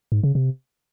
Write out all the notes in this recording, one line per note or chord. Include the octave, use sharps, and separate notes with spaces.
G#2
C#3
C3